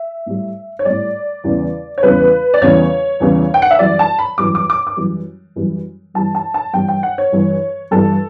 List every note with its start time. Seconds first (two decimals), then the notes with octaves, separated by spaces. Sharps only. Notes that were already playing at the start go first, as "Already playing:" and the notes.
Already playing: E5
0.26 A2 G3
0.79 C#5
0.85 A2 G3 D5
1.44 E2 C#3 E3 G3
1.98 C#5
2.03 E2 C#3 E3 G3 B4
2.54 D5
2.62 E2 C#3 E3 G3 C#5
3.20 E2 C#3 E3 G3
3.54 G5
3.62 F#5
3.71 E5
3.79 F#2 E3 G3 D5
3.99 A5
4.19 B5
4.38 F#2 E3 G3 D6
4.55 D6
4.70 D6
4.87 D6
4.97 F#2 E3 G3
5.56 F#2 E3 G3
6.14 G2 E3 G3 A5
6.35 A5
6.54 A5
6.73 G2 E3 G3 G5
6.88 G5
7.03 F#5
7.18 C#5
7.32 G2 E3 G3
7.91 G2 E3 G3 A4